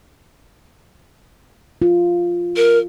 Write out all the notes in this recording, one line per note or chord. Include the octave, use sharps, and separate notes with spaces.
F4
A#4